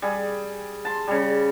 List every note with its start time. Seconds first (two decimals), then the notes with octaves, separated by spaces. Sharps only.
0.02 G3 G#4
0.85 A5 C6
1.07 C#3 G3